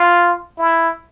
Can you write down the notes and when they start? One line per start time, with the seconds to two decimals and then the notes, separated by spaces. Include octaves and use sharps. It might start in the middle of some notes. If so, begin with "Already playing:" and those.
Already playing: F4
0.58 E4